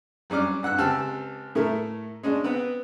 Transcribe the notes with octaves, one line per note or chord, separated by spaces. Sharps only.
F#3 G3 C#4 D6 F6
G2 F#5 E6 F#6
C#2 C4 G4 A5 E6 F6
A2 A3 A#4
G#3 C#4 D4
B3 C4 B4